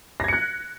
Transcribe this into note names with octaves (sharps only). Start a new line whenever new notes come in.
F#6 G#6 A#6 C#7